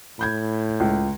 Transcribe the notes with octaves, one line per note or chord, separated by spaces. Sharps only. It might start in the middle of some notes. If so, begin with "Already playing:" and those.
A2 B5 G6 G#6
C#2